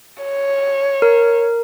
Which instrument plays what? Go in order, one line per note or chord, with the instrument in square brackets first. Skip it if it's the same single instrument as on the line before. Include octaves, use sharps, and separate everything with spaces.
[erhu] C#5
[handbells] A#4